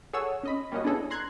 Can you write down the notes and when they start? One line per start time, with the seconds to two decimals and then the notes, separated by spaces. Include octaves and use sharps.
0.13 G#4 A4 C#5 F#5 E6
0.43 C#4 D#5 B5
0.72 G3 A#3 C#4 F#4 D#5
0.84 B3 D4 E4 G#4 A4
1.10 A#5 C6 F#6 G#6